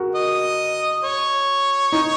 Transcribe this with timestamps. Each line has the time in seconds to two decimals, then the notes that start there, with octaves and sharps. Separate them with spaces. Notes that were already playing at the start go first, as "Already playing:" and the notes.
Already playing: F#4 G#4 A#4
0.15 D#5
1.03 C#5
1.92 D#4